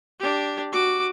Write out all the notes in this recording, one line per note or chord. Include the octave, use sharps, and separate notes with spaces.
D4 G4
F#4 D6